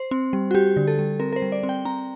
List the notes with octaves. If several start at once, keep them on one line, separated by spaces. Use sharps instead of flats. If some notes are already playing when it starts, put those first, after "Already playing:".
Already playing: C5
C4
G3
F#4
G3 G4
D3
A4
G3
C4 A#4
A#4
C5
G3
D5
C4
G5
C4 A#5